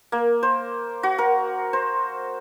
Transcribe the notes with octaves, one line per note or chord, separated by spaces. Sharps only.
A#3
C5
F#4
A#4
C5